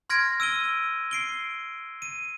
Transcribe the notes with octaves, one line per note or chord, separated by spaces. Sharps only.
C6 F6 G#6 A#6 D7
E6 D7 D#7 G7
C7 D7 G7
D#7